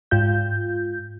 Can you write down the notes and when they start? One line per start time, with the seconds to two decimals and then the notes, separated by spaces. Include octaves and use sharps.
0.11 G#2 F4 G6